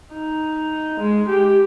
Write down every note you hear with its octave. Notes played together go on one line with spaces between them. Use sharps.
D#4
G#3
G4